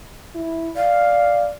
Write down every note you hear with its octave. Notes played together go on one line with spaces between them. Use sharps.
E4
D5 F5